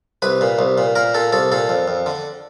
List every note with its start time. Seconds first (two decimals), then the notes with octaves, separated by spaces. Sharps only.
0.22 C2 B4
0.41 A#2
0.59 C2
0.78 A#2
0.95 A#2 A#4
1.14 A#2 A4
1.32 C2 A4
1.52 A#2 A4
1.69 F2
1.88 F2
2.06 D3